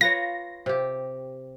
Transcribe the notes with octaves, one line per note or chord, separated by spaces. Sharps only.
F4 B4 C#5 A#6
C3 G4